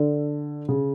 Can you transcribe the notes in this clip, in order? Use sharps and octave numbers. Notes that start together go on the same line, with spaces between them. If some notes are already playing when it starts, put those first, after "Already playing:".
Already playing: D3
C#3